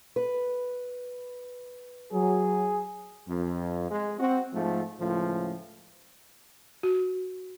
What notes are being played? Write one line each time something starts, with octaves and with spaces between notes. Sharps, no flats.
B4
F#3 G#4
F2
G#3
C4 F#4
G#2 F3 A3
C#2 A2 F3
F#4